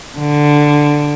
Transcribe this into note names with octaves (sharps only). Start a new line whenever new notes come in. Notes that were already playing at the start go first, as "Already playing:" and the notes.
D3